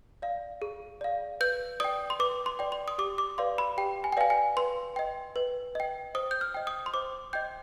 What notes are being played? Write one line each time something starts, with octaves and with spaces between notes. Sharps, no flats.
D5 F5
G#4
D5 F5
B4 G6
D5 G5 D#6
C6
B4 D6
C6
D5 G5
C6
D#6
G4 D6
D6
B4 D5 F5 C6
B5
G4 G5
G#5
G5
B4 D5 F5 G#5
G#5
B4 C6
D#5 G5
B4
D#5 G5
C5 D#6
G6
F6
D#5 G5
D#6
C6
C5 D6
D#5 G5 G6